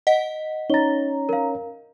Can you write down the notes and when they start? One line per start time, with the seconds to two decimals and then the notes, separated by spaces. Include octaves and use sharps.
0.07 D#5 F#5 B6
0.70 C#4 D#4 C#5 A#5 A6 G7
1.29 A#4 F5